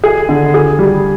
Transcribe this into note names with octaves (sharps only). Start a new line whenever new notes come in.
G#4
D3
G#4
G3